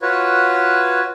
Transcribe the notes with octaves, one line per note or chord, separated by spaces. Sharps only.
F4 F#4 B4 C#5